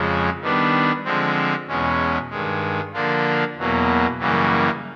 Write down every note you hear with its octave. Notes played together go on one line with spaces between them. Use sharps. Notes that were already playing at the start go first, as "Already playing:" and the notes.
Already playing: F2 C#3 F3 G#3
D#3 G3 B3 D4
D3 F3 G#3 C4
E2 B2 G#3 C#4
G2 D#3 G#3
D3 F3 A#3 D4 F4
E2 B2 F#3 A#3
F#2 C#3 E3 G3 A#3